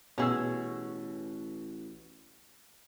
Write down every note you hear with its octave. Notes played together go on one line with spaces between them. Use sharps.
A1 B2 C#4 G#4 E6